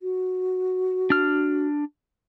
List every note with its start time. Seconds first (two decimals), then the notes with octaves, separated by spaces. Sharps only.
0.01 F#4
1.10 D4 F6